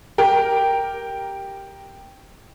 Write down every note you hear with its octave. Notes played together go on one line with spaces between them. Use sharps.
G4 A#4